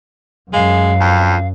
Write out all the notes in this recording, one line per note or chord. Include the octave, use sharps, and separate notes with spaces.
F#2 G#3 F5
F2